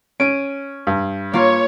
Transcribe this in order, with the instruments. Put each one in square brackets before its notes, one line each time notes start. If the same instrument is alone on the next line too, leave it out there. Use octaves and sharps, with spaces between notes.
[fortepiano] C#4 [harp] D7 D#7
[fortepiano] G2
[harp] A#3 F4 [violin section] C#5